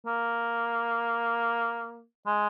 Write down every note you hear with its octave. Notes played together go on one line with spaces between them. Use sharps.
A#3
G#3